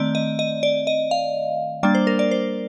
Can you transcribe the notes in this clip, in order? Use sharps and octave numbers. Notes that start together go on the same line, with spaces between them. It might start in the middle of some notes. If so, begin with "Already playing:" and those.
Already playing: D#3 A3 C4 D5
D#5
D#5
D5
D#5
F5
G3 A#3 D4 D5
C5
A#4
D5
C5